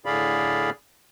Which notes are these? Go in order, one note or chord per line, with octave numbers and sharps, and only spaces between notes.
A2 D3 G#4 D5 F5 B5